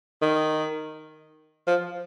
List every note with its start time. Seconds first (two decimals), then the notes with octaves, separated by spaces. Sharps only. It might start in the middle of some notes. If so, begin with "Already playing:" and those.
0.22 D#3
1.67 F3